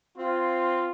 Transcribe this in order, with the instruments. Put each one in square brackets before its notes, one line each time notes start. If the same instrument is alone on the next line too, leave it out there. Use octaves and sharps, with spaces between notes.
[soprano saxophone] C4 [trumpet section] F4